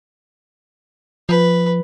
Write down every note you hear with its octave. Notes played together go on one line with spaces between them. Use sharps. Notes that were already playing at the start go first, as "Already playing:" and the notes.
F3 B4